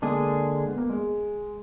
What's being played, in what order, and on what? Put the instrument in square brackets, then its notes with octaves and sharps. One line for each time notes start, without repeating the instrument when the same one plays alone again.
[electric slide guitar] D3 G#3 D4 G#4 [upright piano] A#3
[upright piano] B3
A#3
G#3